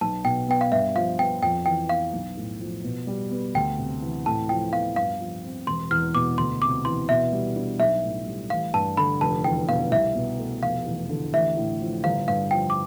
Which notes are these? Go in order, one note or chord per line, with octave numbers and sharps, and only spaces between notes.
B1 A5
B2 G5
B3 G5
F5
G2 E5
F3 F5
B3 G5
F2 G5
E3 G5
B3 F5
B1
A2
F3
B2
G3
B3
D2 G5
C3
E3
A2 A5
F3 G5
B3 F5
G2 F5
F3
C4
E1 C6
E2 F6
B2 D6
D2 C6
C3 D6
E3 C6
B2 E5
G3
D4
B1 E5
A2
G3
A1 F5
G2 A5
D3 B5
F1 A5
E2 G5
B2 F5
C2 E5
B2
A3
F1 F5
E2
D3
A1 E5
A2
F3
G1 F5
G2 F5
F3 G5
D6